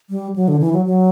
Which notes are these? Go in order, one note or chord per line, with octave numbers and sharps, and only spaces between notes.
G3
F#3
D3
E3
F#3
F#3